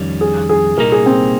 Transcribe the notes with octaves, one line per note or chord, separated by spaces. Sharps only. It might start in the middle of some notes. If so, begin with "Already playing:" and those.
Already playing: F2 D#3 G3 C#4
G#4
G#4
C2 A#2 G3 A#3 D#4 A#4
G#4
C4